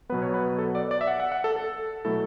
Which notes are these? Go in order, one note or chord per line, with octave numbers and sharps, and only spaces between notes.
B2 F#3 B3 B4
C#5
B4
A4
D5
D5
E5
F#5
F#5
F#5
A4
A4
B2 F#3 A3 E4 A4